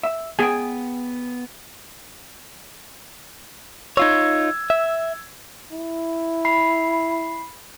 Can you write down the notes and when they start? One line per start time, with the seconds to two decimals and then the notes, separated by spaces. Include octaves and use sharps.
0.03 E5
0.39 B3 G#4 G5 G#5
3.97 D#4 F4 C#5 E6 G#6
4.70 E5
5.72 E4
6.45 B5 C7